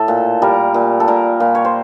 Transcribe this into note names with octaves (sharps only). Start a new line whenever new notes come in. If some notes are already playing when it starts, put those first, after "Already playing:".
Already playing: A2 A4
A#2
G3 A#4
A#2
A4
A#2 A#4
A#2
C#5
C5